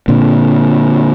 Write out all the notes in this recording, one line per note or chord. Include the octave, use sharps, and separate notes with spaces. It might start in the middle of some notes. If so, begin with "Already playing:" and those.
A#2 D3